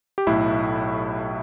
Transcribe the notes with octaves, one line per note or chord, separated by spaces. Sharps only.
G4
B1 A2 A3 E4